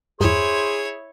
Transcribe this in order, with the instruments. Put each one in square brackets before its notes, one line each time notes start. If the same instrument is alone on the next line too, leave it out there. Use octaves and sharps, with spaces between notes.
[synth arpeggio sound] E2 G2 [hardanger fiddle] E4 C#5 [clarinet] G#4 [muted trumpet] C5